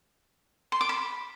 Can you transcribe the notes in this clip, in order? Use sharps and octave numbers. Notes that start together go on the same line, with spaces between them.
C6
D6
B5